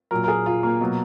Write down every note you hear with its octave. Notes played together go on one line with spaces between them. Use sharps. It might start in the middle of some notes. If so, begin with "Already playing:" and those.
A#2 F#3 A#4
A#4
G#4
F4
A#3
B2 F#3